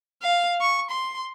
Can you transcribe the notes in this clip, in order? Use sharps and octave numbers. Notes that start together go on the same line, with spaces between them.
F5
C#6
C6